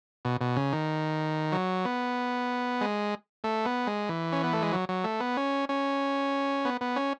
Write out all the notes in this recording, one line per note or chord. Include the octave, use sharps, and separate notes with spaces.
B2
B2
C#3
D#3
F#3
B3
G#3
A3
B3
G#3
E3
C#4
B3
A3
G#3
F#3
F#3
A3
B3
C#4
C#4
B3
B3
C#4